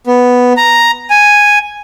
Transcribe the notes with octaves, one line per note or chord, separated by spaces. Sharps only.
B3
A#5
G#5